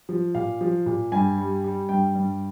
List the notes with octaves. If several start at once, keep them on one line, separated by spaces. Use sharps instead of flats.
F3
A#2 F5
F3
A#2
G2 G#5
G3
G3
G2 G5
G2